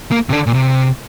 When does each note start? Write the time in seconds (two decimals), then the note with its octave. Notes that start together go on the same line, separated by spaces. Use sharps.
0.12 A#3
0.29 C3
0.33 D3
0.47 A#2
0.54 C3